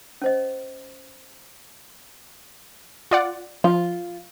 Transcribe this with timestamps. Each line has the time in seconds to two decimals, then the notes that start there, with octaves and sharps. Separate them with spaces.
0.22 C#4 C5 D#5
3.11 F4 D5 F#5
3.64 F3 F4